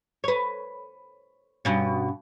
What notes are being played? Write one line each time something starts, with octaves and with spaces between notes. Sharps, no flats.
B4 C#5
G2 B2 C#4